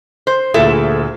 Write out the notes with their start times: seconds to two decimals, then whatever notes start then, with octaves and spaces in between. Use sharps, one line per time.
0.27 C5
0.54 D2 A#2 E4 G#4 A4 E5